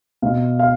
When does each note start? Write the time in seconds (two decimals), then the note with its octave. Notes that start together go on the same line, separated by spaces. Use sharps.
0.22 B2 F5
0.59 F5